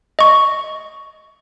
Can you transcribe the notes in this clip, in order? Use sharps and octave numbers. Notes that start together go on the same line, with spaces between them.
D#5 C#6